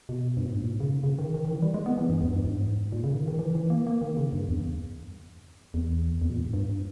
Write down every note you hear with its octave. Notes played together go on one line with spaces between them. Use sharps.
B2
G2
G#2
A#2
C#3
C#3
D#3
D#3
D#3
E3
G3
G#3
B3
E3
G2
E2
G2
G#2
A#2
C#3
D#3
D#3
E3
E3
A#3
A#3
D#3
C#3
G2
E2
E2
E2
A#2
G#2
G2